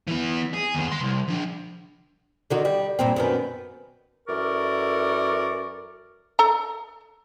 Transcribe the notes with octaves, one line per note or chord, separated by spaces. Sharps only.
E3 B3
G#4
D#2 B3
G#3 C6
C2
F3 D4
D3 D#3 F#4
G3
G2 A#2 C4
F#2 D#3 B3
F#2 E3 A4 A#4 D5 C#6
A4 A#5